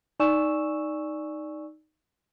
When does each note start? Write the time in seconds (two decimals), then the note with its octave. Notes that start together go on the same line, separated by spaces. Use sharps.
0.20 D#4 D5 G#5 C#6 E6 E7